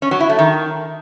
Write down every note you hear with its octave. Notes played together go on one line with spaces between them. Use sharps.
C#4
F#3
E4
A3
D#3